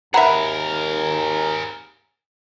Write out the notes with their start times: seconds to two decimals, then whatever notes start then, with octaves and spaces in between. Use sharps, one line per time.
0.14 D#2 G#4 A#4 E5 F#5 A#5 B5